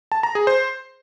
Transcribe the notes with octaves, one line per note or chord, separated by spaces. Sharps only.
A5
A#5
G#4
C5